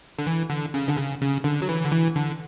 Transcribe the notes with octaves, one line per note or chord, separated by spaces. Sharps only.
D3
E3
D3
C#3
D3
C#3
C#3
D3
F#3
E3
D3
E3
D3